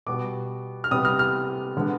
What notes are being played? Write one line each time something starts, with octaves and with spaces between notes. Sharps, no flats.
B2 G3 B3 D6
F6
C3 G3 B3 D#6
F6
F6
D3 G#3 B3